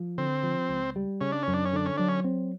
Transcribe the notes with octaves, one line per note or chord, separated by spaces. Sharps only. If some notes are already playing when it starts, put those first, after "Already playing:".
Already playing: F3
D3 C4
F3
C#2
G3
C#3 C#4
D4
F#2 C#4
D4
C#4
D3 D4
C#4
F#3 D4
C#4
C4